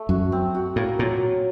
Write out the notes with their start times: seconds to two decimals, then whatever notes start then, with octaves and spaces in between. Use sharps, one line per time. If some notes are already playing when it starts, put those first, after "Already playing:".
Already playing: A3 A4
0.09 F#2 F#4
0.32 C4
0.55 F#4
0.76 A2 A#3
0.99 A#2 F#3